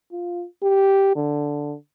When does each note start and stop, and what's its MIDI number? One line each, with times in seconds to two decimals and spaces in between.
0.12 0.44 65
0.63 1.12 67
1.16 1.75 50